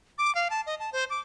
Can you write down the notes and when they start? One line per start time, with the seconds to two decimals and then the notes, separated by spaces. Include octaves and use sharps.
0.18 D6
0.35 F5
0.50 A5
0.67 D#5
0.79 A5
0.93 C5
1.10 D6